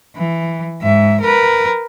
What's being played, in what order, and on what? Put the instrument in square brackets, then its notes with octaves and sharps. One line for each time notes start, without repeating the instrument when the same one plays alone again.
[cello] E3
G#2 E5
A#4 B4